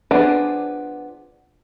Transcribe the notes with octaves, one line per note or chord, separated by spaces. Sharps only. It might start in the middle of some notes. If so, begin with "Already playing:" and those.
F3 B3 D4 G#4 D5